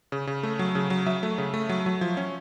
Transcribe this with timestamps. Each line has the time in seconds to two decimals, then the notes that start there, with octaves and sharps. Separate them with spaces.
0.12 C#3
0.27 C#3
0.43 A3
0.59 F#3
0.75 C#3
0.90 F#3
1.06 F#3 E5
1.23 A3
1.38 C#3
1.54 A3
1.69 F#3
1.86 F#3
2.01 F3
2.17 C#4